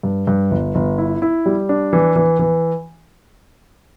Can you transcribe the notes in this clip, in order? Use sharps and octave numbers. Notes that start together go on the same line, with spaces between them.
G2
G2
G1
G1
E4
E4
G3
D4
E3
E3
E3